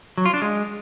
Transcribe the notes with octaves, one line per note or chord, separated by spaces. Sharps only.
F#3
F4
D4
G#3